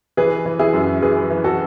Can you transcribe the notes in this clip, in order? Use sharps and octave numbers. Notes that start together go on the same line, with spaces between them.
E3 G#4 B4
E3
E4 G#4
F#2
E3 G#4 B4
E3
F#4 A4